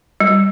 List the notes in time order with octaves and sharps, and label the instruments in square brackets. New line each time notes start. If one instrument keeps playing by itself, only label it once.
[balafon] G3